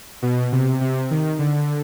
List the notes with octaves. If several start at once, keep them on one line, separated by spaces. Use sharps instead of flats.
B2
C3
C3
D#3
D3